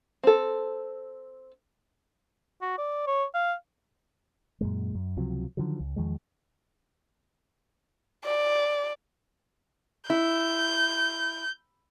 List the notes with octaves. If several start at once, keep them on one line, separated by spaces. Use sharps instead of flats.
C4 A4
F#4
D5
C#5
F5
F#2 A#2 G#3
F#2
C#2 C3 F3 F#3
D3 D#3 F3 F#3
C#2
E2 D#3 F3 G#3
D5
E4 G6